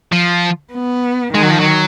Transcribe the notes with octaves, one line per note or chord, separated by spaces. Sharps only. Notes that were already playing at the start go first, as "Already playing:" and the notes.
F3
B3
D#3 G#3
F#3
F3
F#3